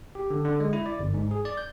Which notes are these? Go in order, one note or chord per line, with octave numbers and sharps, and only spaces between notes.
G4
D3
D3
G#3
E4
D5
G1
G#2
G#4
D5
G6